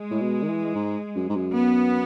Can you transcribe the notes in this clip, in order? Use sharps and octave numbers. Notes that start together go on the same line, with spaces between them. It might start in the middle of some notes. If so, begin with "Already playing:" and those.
Already playing: G#3
A2
B2
D#3
E3
G#2
F#2
G#2
F#2
B3